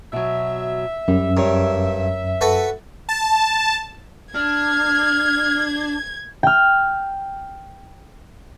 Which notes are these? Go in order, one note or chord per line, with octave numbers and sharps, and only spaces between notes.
B2 F#3 E5
F#2 G3
G2 A#4 C#5
F#4 A4 B4
A5
D4 F6 G#6
G5 F6